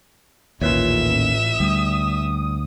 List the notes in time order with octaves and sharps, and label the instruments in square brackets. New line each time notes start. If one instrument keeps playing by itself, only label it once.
[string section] A1 [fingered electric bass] D#2 A#2 [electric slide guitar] F4 B4 C#5 [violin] E5 E7
[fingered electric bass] D2 [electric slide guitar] G3 [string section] D#6